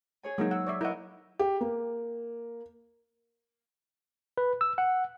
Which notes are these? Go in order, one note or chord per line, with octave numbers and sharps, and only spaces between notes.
G#4 C#5 G#5
F#3 G#3 A#3 D#4
F#5 E6
C#5 D5 E5
E4 A#4 D#5 F5 F#5
G4
A#3
B4
E6
F#5